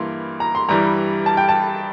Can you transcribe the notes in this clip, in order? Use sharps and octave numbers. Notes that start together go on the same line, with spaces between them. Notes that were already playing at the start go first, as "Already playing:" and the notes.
Already playing: G2 E3 A#3 C6
A#5
C6
G2 E3 G3 A#5
A5
G5
A5